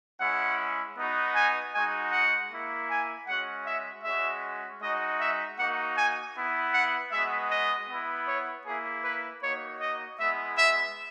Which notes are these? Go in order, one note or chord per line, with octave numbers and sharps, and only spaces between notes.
G#3 C#4 E4 F#5
B3 D#4 F#4
G#5
G#3 D#4 F#4 G#5
F#5
A#3 E4
G#5
G#3 C#4 F#4 F#5
E5
G#3 C#4 F#4 E5
G#3 D#4 F#4 D#5
E5
A#3 D#4 F#4 F#5
G#5
B3 E4
F#5
G#3 B3 F#4 E5
D#5
B3 E4
C#5
A#3 E4 G#4
B4
A#3 D#4 F#4 C#5
D#5
G#3 B3 E4 E5
E5